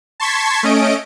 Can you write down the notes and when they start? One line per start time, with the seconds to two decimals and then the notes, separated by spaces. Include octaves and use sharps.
0.20 A5 C6 C#6 G#6 B6
0.63 A3 C#4 D#5 D7